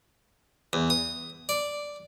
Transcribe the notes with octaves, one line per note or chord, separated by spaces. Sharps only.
E2
D#6
D5